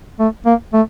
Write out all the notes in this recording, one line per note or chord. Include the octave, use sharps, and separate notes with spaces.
A3
A#3
A3